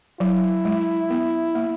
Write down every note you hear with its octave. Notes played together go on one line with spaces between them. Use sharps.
F#3 E4
G#3
B3
A#3